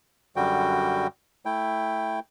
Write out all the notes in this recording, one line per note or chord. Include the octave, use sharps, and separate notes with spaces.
F#2 D3 G3 F#4 G5
A3 E4 G5